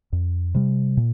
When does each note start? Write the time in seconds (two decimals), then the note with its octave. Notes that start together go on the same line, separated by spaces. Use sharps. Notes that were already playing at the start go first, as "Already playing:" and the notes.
0.13 F2
0.55 C3 G3
0.97 A#2